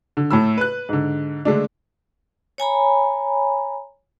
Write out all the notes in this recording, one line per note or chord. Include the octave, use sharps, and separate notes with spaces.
D3
A2 A3 B5 E6
B4 F#6
G#2 D3
D3 G#3 A3 D4
C#5 G#5 A#5 B5